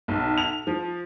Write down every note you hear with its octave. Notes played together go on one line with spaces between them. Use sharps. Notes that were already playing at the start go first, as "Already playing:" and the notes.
B1
F7
F3